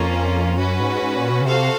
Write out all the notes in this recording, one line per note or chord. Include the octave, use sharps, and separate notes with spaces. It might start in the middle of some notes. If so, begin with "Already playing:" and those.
Already playing: F2 A#3 C#4 F4
F#2 C#4 F#4 B4
G#2
G#2
A#2
B2
C#3
C3 F#4 A4 C5 F5